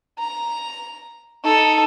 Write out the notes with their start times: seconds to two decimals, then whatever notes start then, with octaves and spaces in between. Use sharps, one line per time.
0.19 A#5
1.44 D#4 A4